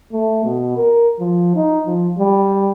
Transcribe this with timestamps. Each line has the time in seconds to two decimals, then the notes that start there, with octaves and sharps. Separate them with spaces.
0.13 A3
0.44 B2
0.77 A#4
1.20 F3
1.56 D#4
1.86 F3
2.19 G3